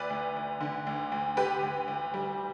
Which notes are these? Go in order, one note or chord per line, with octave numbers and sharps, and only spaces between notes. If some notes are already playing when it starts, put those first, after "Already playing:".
Already playing: D2 B4 D5
D2
D2
D3
D2
D2
D2 G4 B4
D2
D2
G3